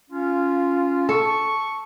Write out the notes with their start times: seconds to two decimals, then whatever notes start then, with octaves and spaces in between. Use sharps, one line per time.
0.11 C#4 F4
1.09 A4 C#6